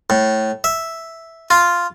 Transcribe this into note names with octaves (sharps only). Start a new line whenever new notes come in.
A2
E5
F4